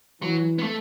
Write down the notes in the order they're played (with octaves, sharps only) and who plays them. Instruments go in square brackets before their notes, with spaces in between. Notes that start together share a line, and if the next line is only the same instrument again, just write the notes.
[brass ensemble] E3 [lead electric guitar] F#3
[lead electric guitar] B3
A3